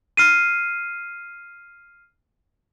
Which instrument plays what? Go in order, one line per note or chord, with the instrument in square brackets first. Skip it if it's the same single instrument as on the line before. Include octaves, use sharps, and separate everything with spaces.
[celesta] F6 C7 D#7